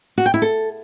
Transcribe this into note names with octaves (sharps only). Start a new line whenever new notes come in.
F#4
G5
E4
A4